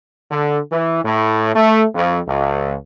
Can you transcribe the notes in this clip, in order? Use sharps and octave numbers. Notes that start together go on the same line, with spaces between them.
D3
E3
A2
A3
F2
C#2